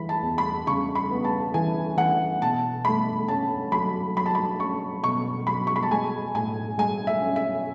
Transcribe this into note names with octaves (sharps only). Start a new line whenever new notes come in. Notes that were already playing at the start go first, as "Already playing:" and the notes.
Already playing: E3 B5
A5
E2
B5
C#3 C#6
B5
B3
A5
E3 G#5
E3 F#5
B2 A5
A3 B5
C#4 A5
F#3 B5
F#3 B5
A5
B5
C#4 C#6
B2 C#6
F#3 B5
C#6
B5
A5
G#3 G#5
A2 G#5
G#3 G#5
E5
C#4
E5